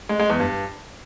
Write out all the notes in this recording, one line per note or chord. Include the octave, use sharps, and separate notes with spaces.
G#3
G#3
E2
G2